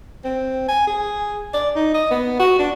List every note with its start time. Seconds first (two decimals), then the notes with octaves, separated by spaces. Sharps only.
0.25 C4
0.68 G#5
0.87 G#4
1.54 D5
1.76 D#4
1.94 D#5
2.11 B3
2.39 F#4
2.59 D4